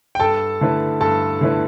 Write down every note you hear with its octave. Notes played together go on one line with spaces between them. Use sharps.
G5
G2 A4 A5
D3 A3 E4 B4
G2 A4 A5
D3 A3 E4 B4